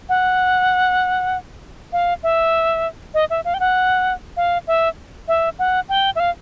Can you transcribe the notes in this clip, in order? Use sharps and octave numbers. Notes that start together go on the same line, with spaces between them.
F#5
F5
E5
D#5
E5
F5
G5
F#5
F5
E5
E5
F#5
G5
E5
F5